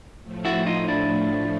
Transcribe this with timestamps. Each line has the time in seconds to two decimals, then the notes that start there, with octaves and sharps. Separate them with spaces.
0.23 A2 F3 A3
0.45 E4 F#4
0.66 D#4 F4
0.88 D4 E4